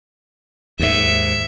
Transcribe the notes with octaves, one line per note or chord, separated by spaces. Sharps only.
D#2 G#2 E5